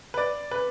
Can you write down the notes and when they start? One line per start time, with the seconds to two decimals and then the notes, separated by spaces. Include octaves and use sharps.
0.14 B4
0.17 D5
0.51 B4